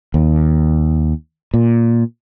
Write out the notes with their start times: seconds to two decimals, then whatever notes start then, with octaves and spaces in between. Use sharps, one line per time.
0.14 D#2
1.54 A#2